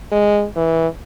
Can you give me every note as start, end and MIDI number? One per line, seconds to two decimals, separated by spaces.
0.12 0.46 56
0.56 0.87 52